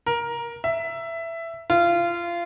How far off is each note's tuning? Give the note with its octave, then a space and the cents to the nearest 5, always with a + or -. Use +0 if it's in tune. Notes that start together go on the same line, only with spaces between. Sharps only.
A#4 +10
E5 +10
F4 -25